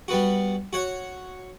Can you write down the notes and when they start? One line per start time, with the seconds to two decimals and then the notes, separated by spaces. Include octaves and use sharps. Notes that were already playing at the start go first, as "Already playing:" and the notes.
0.08 G3 B3 F#4
0.73 F#4 C#5 F#5